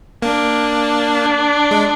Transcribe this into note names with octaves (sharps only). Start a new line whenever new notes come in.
A#3 D4
G#3